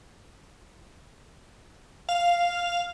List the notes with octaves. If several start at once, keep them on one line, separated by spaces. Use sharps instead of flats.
F5